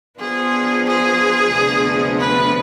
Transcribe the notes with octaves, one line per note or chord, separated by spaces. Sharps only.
F3 B3 D4 F4 G#4 C5
G#4
D2 C3 F3 B3 D4
B4